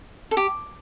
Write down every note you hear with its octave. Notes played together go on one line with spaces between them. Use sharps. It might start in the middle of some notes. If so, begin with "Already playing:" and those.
A4
G4